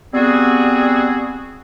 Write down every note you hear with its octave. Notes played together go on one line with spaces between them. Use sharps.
G3 B3 C4 F#4 G#4